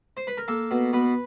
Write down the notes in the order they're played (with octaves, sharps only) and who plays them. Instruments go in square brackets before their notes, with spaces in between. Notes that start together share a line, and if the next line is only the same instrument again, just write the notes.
[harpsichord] C5
B4
A#4
A#3 A4
B2
B2 B4